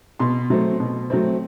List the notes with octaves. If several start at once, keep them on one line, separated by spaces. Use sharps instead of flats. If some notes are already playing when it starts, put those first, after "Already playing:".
B2 C6
F#3 A3 C4
B2
F#3 A3 C4